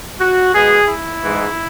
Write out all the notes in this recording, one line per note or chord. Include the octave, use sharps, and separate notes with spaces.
F#4
B2 G#3 B3 G#4
E4
G#2 E3 G#3